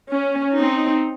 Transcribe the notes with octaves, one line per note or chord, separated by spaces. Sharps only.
C#4
C4 D#4